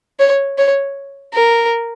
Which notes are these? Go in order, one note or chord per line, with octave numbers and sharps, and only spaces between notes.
C#5
C#5
A#4